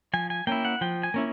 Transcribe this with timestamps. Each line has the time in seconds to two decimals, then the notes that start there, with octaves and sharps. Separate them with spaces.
0.13 F3 G#5
0.30 G#5
0.47 A#3 C#4 E4 G5
0.65 F#5
0.81 F3 G5
1.03 G#5
1.14 A#3 C#4 E4